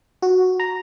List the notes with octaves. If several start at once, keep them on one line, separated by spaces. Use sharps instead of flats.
F#4
A#5